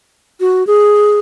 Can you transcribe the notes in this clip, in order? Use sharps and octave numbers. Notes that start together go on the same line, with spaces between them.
F#4
G#4